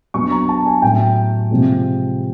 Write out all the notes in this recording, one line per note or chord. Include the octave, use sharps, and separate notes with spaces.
F#3 B3 D4 C#6
A#5
A5
G#5
A2 F#3 A3 G5
C3 F3 G#3